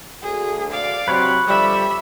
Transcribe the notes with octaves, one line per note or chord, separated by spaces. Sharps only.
D2 G#4
D5 F5
C3 F#3 C4 B4 C#5
D3 F3 G3 E5 B5